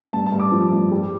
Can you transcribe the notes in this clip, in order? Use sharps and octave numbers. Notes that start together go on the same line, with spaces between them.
G2 A5
A5
G2
D6
F3
G2
G3